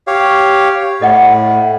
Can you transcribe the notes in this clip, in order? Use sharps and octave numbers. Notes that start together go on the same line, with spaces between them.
G4 C#5 F5
A2 A4 D#5 F#5